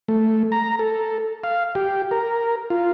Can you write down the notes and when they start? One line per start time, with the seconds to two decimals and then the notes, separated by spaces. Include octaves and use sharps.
0.08 A3
0.52 A#5
0.79 A4
1.44 F5
1.75 G4
2.11 A#4
2.70 F4